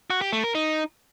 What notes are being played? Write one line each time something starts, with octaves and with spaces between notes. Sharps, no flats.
F#4
G4
A3
A#4
D#4